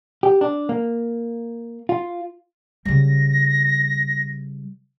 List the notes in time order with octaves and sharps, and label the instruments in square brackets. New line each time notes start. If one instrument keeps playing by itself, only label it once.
[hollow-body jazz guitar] G4
D4
A#3
F4
[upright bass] C#3 G3 [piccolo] A#6